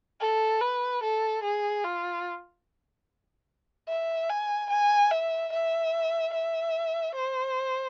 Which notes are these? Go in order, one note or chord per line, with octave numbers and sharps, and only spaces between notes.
A4
B4
A4
G#4
F4
E5
G#5
G#5
E5
E5
E5
C5